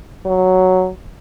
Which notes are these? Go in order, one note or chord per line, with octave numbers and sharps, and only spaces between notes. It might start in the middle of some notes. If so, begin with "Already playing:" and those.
F#3